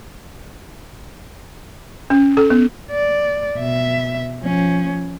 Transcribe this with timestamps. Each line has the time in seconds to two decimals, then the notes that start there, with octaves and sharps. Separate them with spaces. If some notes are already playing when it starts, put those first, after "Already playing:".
2.10 C#4
2.37 A4
2.50 B3
2.91 D5
3.58 B2 E5
4.41 F3 C#4